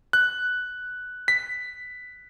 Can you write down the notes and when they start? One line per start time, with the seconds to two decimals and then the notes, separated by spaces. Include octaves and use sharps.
0.13 F#6
1.28 B6